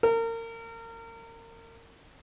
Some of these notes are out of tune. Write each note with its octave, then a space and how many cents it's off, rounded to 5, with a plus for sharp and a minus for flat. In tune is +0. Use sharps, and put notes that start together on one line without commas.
A#4 -30